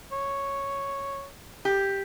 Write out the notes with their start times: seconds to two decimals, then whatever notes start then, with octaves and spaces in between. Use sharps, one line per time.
0.12 C#5
1.65 G4